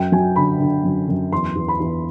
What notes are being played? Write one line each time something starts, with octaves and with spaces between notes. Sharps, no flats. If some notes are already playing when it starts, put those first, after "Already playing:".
Already playing: F#2 G5
F#3 G#5
D3 B5
D3
F#2
F#2
E2 C6
E2
B5
E2